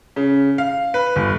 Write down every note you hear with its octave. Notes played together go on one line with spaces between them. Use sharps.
C#3
F5
B4
G1